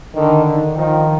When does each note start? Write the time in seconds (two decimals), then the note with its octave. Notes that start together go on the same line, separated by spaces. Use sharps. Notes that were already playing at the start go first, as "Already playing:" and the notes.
0.15 D3 D#3
0.46 D#3
0.77 D#3 F3